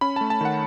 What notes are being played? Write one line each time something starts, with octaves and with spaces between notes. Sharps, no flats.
C#4 B5
A3 A5
A5
D#3 F#5